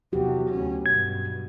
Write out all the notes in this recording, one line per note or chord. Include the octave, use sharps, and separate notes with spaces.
E2 C3 F#3 F#4 G4
D2 C#4
G2 B2 G#6